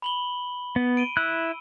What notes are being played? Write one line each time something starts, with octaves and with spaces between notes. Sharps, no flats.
B5 F#7 G7
B3
D7 D#7 G7
E4 E6 F#6